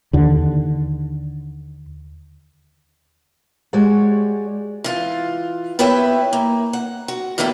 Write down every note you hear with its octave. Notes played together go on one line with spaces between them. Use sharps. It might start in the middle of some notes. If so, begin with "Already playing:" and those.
D#2 D3
G#3 F#4 G4 C#5 D5 F#5
E3 F4
B3 E4 G4 B4 C#5 E5
A#3
F#5
F#4
E2 A2 E3 A#3 E4 A4